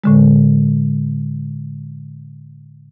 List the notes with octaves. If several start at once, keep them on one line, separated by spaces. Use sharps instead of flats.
A2 D3 G#3